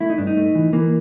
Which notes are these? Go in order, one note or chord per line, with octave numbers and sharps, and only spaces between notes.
A3 E4
D#4
G2 D4
D#4
A3
E3
E3 A#3